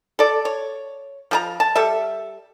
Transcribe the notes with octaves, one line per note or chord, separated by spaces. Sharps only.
A4 D5
C#5
F3 G#4 A#5
A5
G3 A4 E5